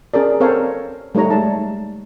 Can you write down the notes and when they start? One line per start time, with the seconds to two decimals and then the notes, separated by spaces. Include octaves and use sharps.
0.14 C#4 G#4 A#4 D5
0.40 C4 A4 A#4 C5 C#5 F5
1.15 G3 A3 D#4 C#5 A#5
1.30 G#3 D#4 D5 A5